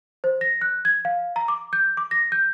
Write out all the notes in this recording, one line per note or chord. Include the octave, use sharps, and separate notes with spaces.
C5
A#6
F#6
G#6
F5
A#5
D6
G6
D6
A#6
G6